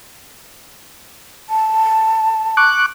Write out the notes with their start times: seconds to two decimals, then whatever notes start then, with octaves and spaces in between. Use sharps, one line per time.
1.50 A5
2.57 C#6 D6 F#6